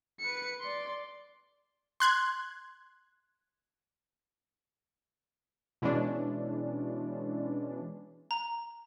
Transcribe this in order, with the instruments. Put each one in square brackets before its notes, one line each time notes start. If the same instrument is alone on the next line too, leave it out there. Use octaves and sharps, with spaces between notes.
[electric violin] B4 C#7
D5 C6
[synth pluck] C6 F#6 G#6
[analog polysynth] B2 E3 G#3 C#4 D4
[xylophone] A#5